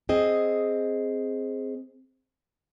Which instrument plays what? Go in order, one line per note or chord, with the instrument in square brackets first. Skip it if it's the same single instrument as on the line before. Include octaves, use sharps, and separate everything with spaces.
[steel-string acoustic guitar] C4 G#4 D#5